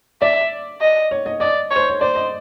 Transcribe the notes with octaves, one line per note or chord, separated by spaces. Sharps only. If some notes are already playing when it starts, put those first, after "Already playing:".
D5 E5
D#5
C#5
D#5
D5 D#5
C#5
C5
C#5
C5 D5
D#5